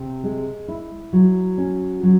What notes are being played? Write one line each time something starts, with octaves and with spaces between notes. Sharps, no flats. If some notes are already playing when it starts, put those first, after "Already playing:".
Already playing: C3
G#3
E4
F#3
C#4
F#3